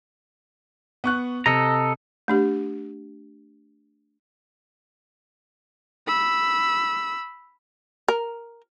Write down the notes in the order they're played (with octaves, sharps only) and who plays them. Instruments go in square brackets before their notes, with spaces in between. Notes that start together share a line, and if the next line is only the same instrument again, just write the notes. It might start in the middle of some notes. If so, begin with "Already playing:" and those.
[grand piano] B3 C#6 F#6
[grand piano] C3 [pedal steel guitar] A4 D#5 A#5
[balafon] A3 D4 G4
[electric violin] B5 E6
[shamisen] A#4